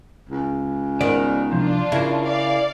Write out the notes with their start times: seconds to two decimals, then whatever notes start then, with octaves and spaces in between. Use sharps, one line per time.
0.29 C#2
1.01 D#3 B3 A#4 D5
1.52 C2 F3 D4 F4
1.92 C#3 E4 A#4
2.26 D5 F5